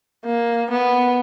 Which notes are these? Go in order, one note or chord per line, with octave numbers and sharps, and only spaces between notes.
A#3
B3